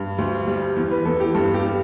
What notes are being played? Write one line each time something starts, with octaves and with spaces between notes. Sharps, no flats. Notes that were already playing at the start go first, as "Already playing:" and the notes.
Already playing: G2
D2
G3
E2
B4
E2 A4
G4
G2 A4
G4
G3